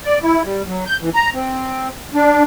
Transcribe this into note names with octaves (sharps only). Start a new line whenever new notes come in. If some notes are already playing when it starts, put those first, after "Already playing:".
D5
E4
G3
F#3
G6
E3
A#5
C4
D4